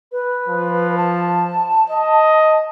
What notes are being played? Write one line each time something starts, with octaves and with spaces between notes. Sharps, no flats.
B4
F3
A5
D#5